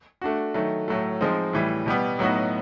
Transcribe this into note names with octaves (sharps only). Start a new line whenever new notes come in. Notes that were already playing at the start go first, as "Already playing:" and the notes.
A3 D4 F#4
D#3 F#3 A3
A2 F#3 A3
F3 G#3 C4 D#4
A2 E3 G3
B2 G3 B3
A2 F#3 B3 D#4 F#4